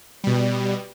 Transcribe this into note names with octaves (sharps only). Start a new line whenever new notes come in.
B2 G3